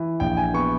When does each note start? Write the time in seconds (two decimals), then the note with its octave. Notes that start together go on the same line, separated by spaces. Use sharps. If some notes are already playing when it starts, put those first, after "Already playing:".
Already playing: E3
0.20 A#1 G5
0.37 G#5
0.54 B3 C#6